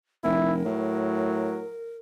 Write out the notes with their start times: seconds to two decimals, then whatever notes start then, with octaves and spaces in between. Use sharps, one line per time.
0.24 F1 E4 A#4
0.65 A2 F#3